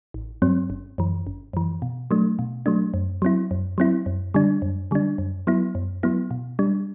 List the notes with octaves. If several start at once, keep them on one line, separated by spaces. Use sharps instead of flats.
A1
G2 F#3 C4
G1
F#2 E3
G1
F#2 E3
B2
F#3 A3 D4
B2
F#3 A3 D4
F#2
F#3 C4 E4
F#2
F#3 C4 E4
F#2
D3 G3 D4
F#2
D3 G3 D4
F#2
F#3 B3 E4
F#2
F#3 B3 E4
B2
G3 D4